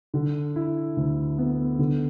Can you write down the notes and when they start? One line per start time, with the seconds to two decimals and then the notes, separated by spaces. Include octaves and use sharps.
0.14 D3
0.56 E4
0.97 D2
1.38 B3
1.79 D3